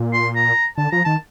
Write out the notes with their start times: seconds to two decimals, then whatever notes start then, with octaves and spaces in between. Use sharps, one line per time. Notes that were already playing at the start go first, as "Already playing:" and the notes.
Already playing: A#2
0.13 C6
0.36 A#5
0.77 D3 A5
0.92 F3 A#5
1.05 D#3 A5